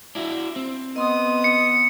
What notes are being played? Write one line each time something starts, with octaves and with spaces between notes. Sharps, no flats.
D4 E4 F#4
C4
B3 D#5 C6 D#6
C#7